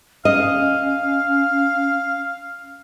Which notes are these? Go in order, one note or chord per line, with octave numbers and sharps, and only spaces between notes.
C#4 D#5 F5